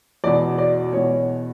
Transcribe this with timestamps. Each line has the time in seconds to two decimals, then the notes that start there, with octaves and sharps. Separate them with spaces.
0.24 E2 B2 D5
0.58 D5
0.93 E2 B2 C#5